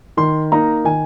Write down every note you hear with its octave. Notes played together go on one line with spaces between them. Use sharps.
D#3 C6
A#3 D#4 A#5
D#3 G#5